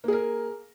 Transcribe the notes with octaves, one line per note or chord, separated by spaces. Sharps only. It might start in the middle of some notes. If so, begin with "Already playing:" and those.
A#3 G#4 A#4